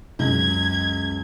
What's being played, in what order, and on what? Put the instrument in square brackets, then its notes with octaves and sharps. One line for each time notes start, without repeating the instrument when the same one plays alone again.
[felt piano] C#2 F#2 [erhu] G#6